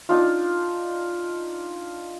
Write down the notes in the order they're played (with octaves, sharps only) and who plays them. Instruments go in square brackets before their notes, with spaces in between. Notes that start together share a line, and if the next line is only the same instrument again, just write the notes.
[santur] D4 D#4 F4